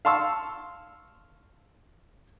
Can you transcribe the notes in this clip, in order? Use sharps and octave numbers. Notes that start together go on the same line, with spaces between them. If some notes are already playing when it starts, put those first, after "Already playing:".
F5 A5 C6 C#6 E6